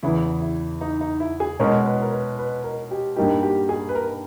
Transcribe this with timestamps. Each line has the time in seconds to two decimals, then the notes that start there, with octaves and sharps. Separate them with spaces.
0.03 E2 C#3 E3 E4
0.41 E4
0.81 D#4
1.01 D#4
1.20 E4
1.40 G#4
1.59 B2 G#3 C#4 A#4
1.86 B4
2.02 A#4
2.12 B4
2.39 B4
2.64 A#4
2.91 G4
3.16 G2 G3 A#3 D#4 G4
3.43 G4
3.69 G#4
3.89 B4
3.95 A#4